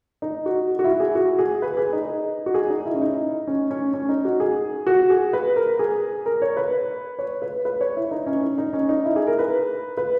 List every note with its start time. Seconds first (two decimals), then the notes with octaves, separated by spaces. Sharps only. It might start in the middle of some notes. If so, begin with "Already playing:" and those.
0.22 D#4
0.46 F#4
0.79 F#4
0.84 E4
1.00 G#4
1.15 F#4
1.39 G#4
1.62 B4
1.77 G#4
1.93 D#4
2.46 F#4
2.54 G#4
2.70 D#4
2.86 E4
2.94 C#4
3.01 D#4
3.47 C#4
3.71 C#4
3.93 C#4
4.09 D#4
4.25 F#4
4.40 G#4
4.87 F#4
5.10 G#4
5.33 B4
5.56 A#4
5.79 G#4
6.26 A#4
6.42 C#5
6.57 B4
7.19 C#5
7.42 B4
7.65 B4
7.81 C#5
7.96 E4
8.11 D#4
8.27 C#4
8.43 D#4
8.58 D#4
8.73 C#4
8.89 D#4
9.05 E4
9.16 G#4
9.27 A#4
9.39 B4
9.97 B4